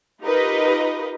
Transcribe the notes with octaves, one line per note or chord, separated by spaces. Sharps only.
D#4 F4 G4 A#4 B4 D#5